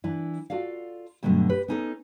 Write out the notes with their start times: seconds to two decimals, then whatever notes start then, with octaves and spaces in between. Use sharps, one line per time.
0.04 E3 D4 E4
0.50 F4 F#4 A4 D5 F5
1.23 G2 B2 D3 F#3 A3
1.49 G4 B4
1.68 B3 C#4 D#4 F#4 A4